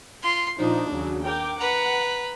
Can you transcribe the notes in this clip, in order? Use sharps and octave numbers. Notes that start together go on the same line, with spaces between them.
F4 C6
A#2 F3 D4 D#4
D#2 C#3 F#3
A#4 G5 D6
B4 F#5 A#5